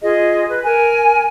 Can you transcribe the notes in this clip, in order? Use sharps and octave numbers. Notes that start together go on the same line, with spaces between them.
F4 G#4 D#5
B4
A#4 G#5